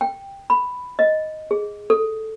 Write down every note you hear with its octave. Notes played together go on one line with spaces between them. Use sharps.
G5
B5
D#5
G#4
A4